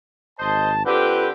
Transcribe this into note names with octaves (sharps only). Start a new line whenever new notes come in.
G#1 C5 D#5 A5
D3 C4 F4 G4 A4 B4